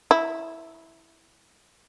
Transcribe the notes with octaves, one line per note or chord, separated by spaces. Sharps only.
E4